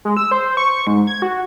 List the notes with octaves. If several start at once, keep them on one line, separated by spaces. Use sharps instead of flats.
G#3
E6
C5
C#6
G#2
G#6
F#4